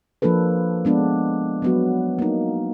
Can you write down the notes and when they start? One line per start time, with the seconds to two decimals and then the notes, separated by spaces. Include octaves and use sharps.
0.22 F3 A#3 D4 A4 B4
0.85 G#3 B3 D4
1.62 F#3 B3 F#4
2.19 A#3 D#4